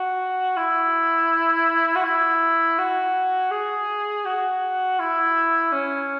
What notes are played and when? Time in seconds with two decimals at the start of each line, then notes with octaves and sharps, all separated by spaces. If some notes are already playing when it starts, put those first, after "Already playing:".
Already playing: F#4
0.57 E4
1.96 F#4
2.04 E4
2.78 F#4
3.51 G#4
4.25 F#4
5.00 E4
5.72 C#4